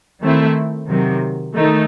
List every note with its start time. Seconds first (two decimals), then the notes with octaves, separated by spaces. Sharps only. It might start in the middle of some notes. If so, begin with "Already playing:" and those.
0.22 D#3 A3 C4 E4
0.88 C3 D#3 F#3
1.54 D#3 A3 D#4